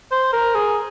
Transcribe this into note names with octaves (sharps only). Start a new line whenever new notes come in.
C5
A#4
G#4